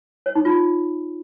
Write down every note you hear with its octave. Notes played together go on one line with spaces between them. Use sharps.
C#5
D#4
F4